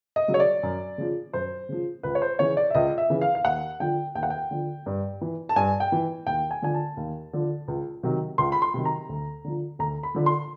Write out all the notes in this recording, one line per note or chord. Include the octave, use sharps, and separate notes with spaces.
D#5
C#3 F#3
C#5
D5
F#2
C#3 F3
F#2 C5
C#3 F3
C#2 B4
C#5
C5
C#3 E3 C#5
D5
E5
C#2 D#5
E5
C#3 E3
F5
F5
D#2 F#5
D3 F3 G5
D#2 G5
F#5
G5
D3 F3
G2
E3
A5
G2 G#5
G5
E3
D#2 G5
G#5
D3 F3 G#5
A5
D#2
D3 F3
C#2
C3 D#3 F#3
C#2 C6
B5
C6
C3 D#3 F#3
A#5
D2
D3 F3
D2 A#5
B5
D3 F3
C6